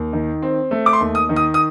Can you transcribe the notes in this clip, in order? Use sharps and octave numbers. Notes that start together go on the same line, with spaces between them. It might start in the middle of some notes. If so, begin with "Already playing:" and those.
Already playing: D#2
D#3
C4
A3
D6
C6
D#2
D#6
D#3
D#6
D#6